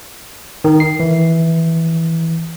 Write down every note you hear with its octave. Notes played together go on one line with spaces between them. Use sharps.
D#3
C7
E3